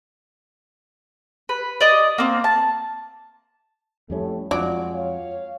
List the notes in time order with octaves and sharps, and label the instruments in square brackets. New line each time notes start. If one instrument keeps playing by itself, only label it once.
[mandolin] B4
D5 D#5
A#3 C4
A5
[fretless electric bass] F2 G3 C#4 [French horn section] A2 A3
[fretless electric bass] F2 [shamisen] F#3 D5 [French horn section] G#3 F4
[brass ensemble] C#5 F5